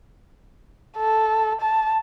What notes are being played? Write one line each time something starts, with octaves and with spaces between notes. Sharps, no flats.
A4
A5